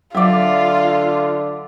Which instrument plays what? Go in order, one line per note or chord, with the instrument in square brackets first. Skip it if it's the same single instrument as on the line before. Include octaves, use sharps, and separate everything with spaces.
[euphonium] D3 [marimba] F#3 [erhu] F4 [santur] D5 E5